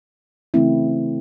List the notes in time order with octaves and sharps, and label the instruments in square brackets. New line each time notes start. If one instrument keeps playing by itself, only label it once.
[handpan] C#3 E3 A3 C4 E4